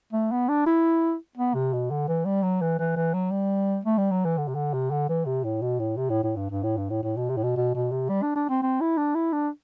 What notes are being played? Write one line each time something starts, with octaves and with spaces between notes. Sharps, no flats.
A3
B3
D4
E4
B3
C3
B2
D3
E3
G3
F#3
E3
E3
E3
F#3
G3
A3
G3
F#3
E3
D3
C3
D3
C3
D3
E3
C3
A2
B2
A2
C3
A2
A2
G2
G2
A2
G2
A2
A2
B2
C3
A2
B2
B2
B2
C3
G3
D4
D4
C4
C4
E4
D4
E4
D4